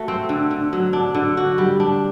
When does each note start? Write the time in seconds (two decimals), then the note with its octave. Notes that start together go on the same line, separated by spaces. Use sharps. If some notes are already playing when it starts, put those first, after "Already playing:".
Already playing: A3 F#4
0.08 C4
0.29 D3
0.51 D3
0.73 F#3
0.93 D4
1.15 D3
1.37 F#4
1.58 G3
1.80 D4